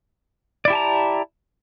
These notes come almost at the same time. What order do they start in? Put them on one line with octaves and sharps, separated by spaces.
D5 E4 G4 A5 A#5